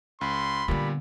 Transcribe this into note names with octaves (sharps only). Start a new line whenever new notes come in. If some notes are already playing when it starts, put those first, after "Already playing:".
C#2 B5 C6
A#2 D3 G3 B3